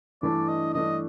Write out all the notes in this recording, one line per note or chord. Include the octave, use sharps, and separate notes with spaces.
G2 E3 A3 D4 D5
D#5
G2 E3 A3 D4 D#5